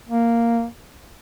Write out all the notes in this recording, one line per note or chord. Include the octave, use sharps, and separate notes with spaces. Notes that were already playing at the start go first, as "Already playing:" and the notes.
A#3